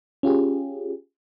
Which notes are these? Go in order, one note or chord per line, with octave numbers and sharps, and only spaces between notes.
C#4 F4 G4 G#4